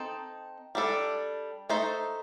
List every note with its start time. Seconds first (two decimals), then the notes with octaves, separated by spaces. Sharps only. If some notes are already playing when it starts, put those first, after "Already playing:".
Already playing: C4 D#4 A4
0.75 G3 D4 A4
1.69 A3 D#4 A4 C5